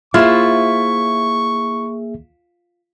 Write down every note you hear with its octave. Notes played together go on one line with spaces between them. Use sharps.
A#3 E4 F4 G#4 C5 E5 C#6